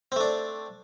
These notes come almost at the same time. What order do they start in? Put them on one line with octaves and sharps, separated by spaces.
C4 A3 D4